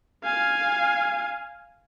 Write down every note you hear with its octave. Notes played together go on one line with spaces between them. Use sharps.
F5 G#5